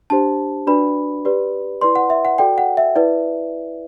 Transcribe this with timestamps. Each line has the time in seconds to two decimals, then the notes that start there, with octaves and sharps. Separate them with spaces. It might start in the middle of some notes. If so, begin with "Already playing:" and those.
0.10 D4 G4 C5 A5
0.67 D4 F#4 B4 D5 B5
1.25 G4 B4 D5
1.81 E4 B4 D5 C6
1.96 F#5
2.10 E5
2.25 F#5
2.38 F#4 A4 D5 G5
2.58 F#5
2.77 E5
2.96 E4 B4 D5